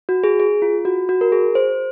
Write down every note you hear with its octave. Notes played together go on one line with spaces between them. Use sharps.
F#4
G#4
G#4
F4
F#4
F#4
A#4
G#4
C5